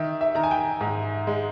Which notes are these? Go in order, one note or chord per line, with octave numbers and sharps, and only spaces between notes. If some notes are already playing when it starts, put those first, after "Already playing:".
Already playing: D#3 E5
E5
D#3 A#5
G#5
G5
G#2
G#3